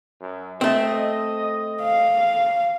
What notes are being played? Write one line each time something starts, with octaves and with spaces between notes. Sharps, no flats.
F#2
A3 C4 D#5
F5